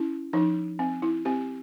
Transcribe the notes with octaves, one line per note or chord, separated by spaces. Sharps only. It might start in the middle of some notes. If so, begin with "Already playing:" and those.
Already playing: C#4 E4
F3 D#4
C4
E4
C4 G4